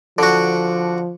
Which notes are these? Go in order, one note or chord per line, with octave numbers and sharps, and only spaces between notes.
D3 F3 F#4